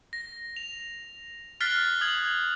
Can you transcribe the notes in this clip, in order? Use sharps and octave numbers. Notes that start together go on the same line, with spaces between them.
A#6
F7
F6 F#6 A6 B6 C7 G7
D#6 G#6 F#7